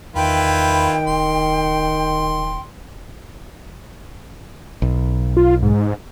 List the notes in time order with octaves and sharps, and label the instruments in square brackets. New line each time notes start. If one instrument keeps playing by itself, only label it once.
[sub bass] E2 [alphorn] D#3 [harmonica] E4 F4 B4 [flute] G5
[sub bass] D#1 [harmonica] C6
[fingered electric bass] B1
[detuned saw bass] F4
G#2